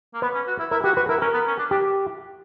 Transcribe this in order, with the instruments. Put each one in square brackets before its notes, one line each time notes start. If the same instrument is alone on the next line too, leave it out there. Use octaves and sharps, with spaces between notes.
[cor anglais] A#3
[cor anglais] B3 [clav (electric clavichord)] B4
[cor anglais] C#4
F#4
E4
[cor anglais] E4 [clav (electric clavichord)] A#4
[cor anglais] F#4 [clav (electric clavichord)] G4
[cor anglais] F#4 [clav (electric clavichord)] B4
[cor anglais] E4 [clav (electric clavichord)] A#4
[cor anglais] C#4 [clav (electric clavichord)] A#4
[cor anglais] B3
C#4
D4
[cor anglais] D4 [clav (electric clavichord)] G4